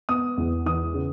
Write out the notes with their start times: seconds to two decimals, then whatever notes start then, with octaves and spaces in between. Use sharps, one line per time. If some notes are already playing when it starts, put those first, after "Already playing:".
0.09 B3 D#6
0.37 E2
0.66 E3 D#6
0.94 C#3